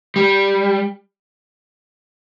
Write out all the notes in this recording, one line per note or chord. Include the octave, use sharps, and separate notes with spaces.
G3